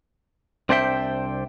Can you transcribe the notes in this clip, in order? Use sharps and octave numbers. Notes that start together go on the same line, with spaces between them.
C2 C4 D4 C5 E5 G5